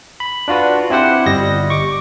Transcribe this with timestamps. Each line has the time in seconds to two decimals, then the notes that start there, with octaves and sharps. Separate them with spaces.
0.20 B5
0.48 D4 F4 F#4 B4
0.90 C4 E4 G4 C5 F#5
1.26 G1 G3 D#5 A#6
1.70 C#6 D6